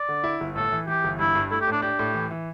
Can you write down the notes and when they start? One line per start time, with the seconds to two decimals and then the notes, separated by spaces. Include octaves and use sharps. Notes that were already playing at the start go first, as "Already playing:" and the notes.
Already playing: D5
0.09 D3
0.24 E4
0.41 G1
0.56 A2 A4
0.72 E3
0.88 E3 G4
1.04 G1
1.19 G2 E4
1.35 G2
1.51 A3 E4
1.61 G4
1.67 A2 D4
1.82 D4 G4
1.99 A2
2.14 E3
2.31 E3